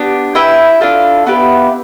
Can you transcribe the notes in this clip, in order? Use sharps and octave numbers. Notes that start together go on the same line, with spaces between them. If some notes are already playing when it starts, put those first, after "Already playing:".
Already playing: B3 D4 G4
E4 B4 E5 G5
D4 F4 A4
B3 E4 G4 B4